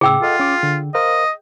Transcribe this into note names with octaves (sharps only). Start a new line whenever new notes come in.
A2 C#3 G#4 G5 E6
F4 A4 D#5 F#5
C#4 D6
D3
A#4 C5 D#5 F5